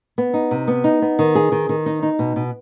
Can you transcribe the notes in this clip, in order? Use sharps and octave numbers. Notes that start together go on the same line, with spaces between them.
B3
D#4
C3
B3
D#4
B3
D#3
G#4
D#3
D#3
D#4
D#4
B2
B2